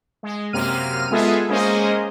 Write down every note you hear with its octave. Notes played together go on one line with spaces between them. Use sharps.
G#3
F#2 C3 A#3 F6 D#7
G#3 B3 F4 G#4 A4 E5
G#3 A#3 C#4 G#4 C5 D#5